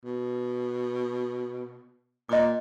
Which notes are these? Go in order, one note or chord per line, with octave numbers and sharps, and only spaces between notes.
B2
A#2 D#5 D6